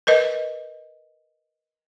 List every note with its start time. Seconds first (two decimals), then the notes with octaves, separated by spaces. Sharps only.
0.07 A#4 B4 D#5